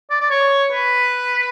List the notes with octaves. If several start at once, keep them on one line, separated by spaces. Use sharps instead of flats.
D5
D5
C#5
B4